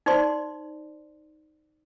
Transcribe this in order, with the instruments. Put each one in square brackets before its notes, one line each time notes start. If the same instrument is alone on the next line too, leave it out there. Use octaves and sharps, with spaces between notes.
[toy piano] D#4 C5 D5 C6